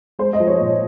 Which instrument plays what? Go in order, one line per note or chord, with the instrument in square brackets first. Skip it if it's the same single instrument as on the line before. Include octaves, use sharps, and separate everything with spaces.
[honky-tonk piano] G#3 C5
D#5
F3
C#5
A#2